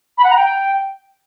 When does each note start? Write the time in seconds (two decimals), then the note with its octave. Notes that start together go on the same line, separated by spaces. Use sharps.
0.18 B5
0.24 F#5
0.30 A#5
0.36 G5